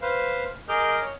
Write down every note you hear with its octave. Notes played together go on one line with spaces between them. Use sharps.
B4 C5 F5
G#4 A#4 D#5 D6 F6 G6
C#5